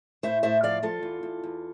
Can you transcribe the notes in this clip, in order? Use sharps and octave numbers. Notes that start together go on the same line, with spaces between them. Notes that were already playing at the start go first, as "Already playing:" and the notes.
A2 C5 E5
A2 C5 E5
F3 D5 F5
F3 F4 A4
E2
E2
E2